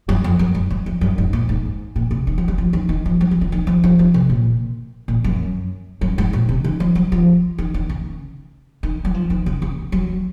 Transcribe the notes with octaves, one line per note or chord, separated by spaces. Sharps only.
F#2
F2
F#2
G#2
F#2
F2
F#2
G#2
A#2
G#2
A#2
C3
D#3
F3
F#3
F3
D#3
D#3
F3
F#3
F3
F3
D#3
F3
F3
F3
C3
A#2
A#2
F#2
F#2
G#2
A#2
C3
D#3
F3
F#3
F3
D#3
D#3
C#3
D#3
F#3
F3
D#3
C#3
C#3
F#3